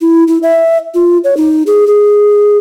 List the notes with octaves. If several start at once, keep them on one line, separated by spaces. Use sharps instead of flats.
E4
E4
E5
F4
C#5
D#4
G#4
G#4